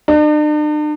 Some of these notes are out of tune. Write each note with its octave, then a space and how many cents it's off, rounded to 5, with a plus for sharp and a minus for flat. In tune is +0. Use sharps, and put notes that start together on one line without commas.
D4 +45